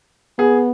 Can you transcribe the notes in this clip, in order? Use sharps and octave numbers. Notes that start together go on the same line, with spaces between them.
B3 G#4